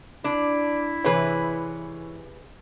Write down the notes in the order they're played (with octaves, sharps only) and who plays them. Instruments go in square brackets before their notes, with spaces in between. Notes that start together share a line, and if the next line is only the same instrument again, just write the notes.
[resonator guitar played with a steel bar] D4 [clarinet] E4
[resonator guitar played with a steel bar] C3 G#4 B4 [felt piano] E3 C#5